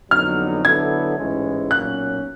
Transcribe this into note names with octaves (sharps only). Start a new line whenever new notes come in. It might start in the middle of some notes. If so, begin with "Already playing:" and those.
F2 D3 F#3 B3 D#4 F6
D3 F#3 B3 E4 A4 G#6
A1 G#2 E3 G#3 C#4
B1 A#2 F#3 A#3 C#4 F#6